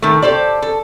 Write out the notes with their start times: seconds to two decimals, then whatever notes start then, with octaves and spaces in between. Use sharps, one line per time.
0.02 D#3 A3
0.22 G4 A4 C5 D5
0.62 A4